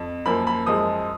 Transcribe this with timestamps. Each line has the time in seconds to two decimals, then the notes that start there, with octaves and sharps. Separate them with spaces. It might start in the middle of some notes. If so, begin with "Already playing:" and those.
Already playing: F2
0.26 F#2 F3 A#3 B5
0.47 B5
0.66 F#2 F3 G#3 D#6